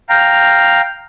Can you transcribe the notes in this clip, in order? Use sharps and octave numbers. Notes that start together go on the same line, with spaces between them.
F5 G5 A#5